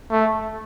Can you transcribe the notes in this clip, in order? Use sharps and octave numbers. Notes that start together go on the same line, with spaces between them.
A3